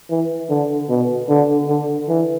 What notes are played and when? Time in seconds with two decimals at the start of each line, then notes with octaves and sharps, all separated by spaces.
0.10 E3
0.50 D3
0.89 B2
1.29 D3
1.69 D3
2.09 E3